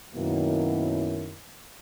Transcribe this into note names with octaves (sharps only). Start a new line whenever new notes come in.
F#2 B2 D#3 F#3 A#3 E4